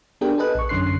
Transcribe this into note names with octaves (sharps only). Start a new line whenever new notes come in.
B3 D4 G4 G#4 A#4 G5
G#4 A4 B4 D#5 F#6
A#1 C#6
F#2 D3 C#4 C6 F#6 C7